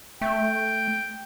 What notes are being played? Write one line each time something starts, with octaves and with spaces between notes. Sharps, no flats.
A3 G5